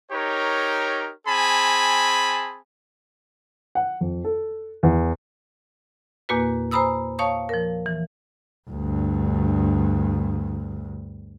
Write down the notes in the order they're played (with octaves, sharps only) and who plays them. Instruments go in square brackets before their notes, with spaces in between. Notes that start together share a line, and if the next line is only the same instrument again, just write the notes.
[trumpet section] D#4 G4 A#4 C#5
C4 G#4 G#5 A5 B5
[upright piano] F#5
F2
A4
E2
[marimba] E2 A#2 A#3 F#4 B4
C5 G#5 A#5 B5 D#6 E6
C#5 F5 A5 C#6 D#6
F3 A#4
E3
[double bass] D2 G2